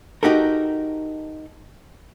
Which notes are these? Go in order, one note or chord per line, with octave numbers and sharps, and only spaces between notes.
D#4 F#4 G4 A4 A#4